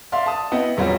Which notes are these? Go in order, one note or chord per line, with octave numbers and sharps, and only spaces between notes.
D5 E5 F5 C6
A5 D#6
B3 E4 D#5 F#5 G5
E1 F#3 G3 F4 F#4